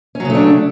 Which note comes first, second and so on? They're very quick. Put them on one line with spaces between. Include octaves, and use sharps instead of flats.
C#4 F#3 C#3 A3 D4